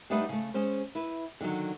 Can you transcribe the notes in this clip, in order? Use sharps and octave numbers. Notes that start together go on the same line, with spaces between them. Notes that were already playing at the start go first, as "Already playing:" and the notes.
G3 A3 D4 D#4 B4 F#5
C#3 A3
G#3 C#4 C5
E4 B4
D3 D#3 F3 F#3